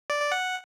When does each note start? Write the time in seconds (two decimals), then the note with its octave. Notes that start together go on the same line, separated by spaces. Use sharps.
0.10 D5
0.21 D5
0.32 F#5